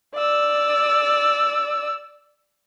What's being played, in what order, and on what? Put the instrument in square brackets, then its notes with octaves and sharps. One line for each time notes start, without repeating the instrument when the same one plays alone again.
[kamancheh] D5 E6